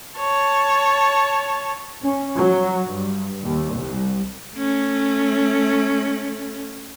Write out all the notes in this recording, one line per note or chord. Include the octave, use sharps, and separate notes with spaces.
C#5 A5
C#4
F#3
G2
D#2
C2
A3 C#4